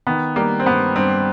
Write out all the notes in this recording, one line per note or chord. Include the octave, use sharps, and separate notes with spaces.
D#3 B3
G3 A#3
C4
G2 B3
G2 C4